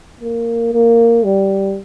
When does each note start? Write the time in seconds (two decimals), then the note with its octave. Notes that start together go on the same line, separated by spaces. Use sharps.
0.21 A#3
0.73 A#3
1.25 G3